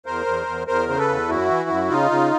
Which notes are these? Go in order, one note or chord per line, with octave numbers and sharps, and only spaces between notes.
E2 A#4 C5
E2
E2
E2 A#4 C5
C#3 C5
A4 B4
E2
F#2 E4 F#4
E3
F#2
C#3 D#4 F4
C#3